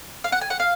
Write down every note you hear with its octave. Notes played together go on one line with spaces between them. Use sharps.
F5
F#5
G#5
F#5
F5